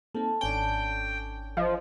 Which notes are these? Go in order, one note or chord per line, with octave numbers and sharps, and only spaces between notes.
A#3 C4 D#4 A4 D6
G#1 C#4 D4 G5 G#5
F3 D#5